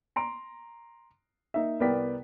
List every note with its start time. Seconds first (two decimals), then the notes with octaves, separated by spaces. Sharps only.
0.16 A#5 C6 D7
1.54 A#3 D#4 E5
1.80 C2 B3 A#4 D5 G5 B6